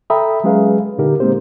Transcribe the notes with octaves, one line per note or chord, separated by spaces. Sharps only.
A4 E5 G5 A#5 B5 D#6
F#3 G#3 C#4 G#4 B4 F5
A#2 D3 D#4 G4 A#4
G#3 A#3 C4 G4 C5